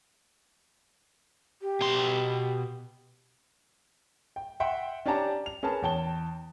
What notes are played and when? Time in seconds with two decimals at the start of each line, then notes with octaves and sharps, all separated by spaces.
1.62 G4
1.81 B2 C6
4.36 G5
4.60 E5 F#5 G5 C6
5.05 C#4 D4 G4 D5 A5 A#5
5.46 F7
5.63 C#4 G#4 A#4 B4 A5
5.82 E2 C#5 G5 A5 G7